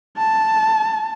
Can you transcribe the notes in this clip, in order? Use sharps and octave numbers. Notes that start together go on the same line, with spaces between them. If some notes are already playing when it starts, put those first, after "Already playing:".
A5